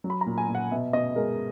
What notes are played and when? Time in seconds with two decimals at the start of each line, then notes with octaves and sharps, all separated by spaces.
0.04 F#3
0.10 B5
0.21 A#5
0.26 A#2
0.38 G#5
0.49 A#2
0.55 F#5
0.71 B2 E5
0.93 B2 D#5
1.16 G#3 A#4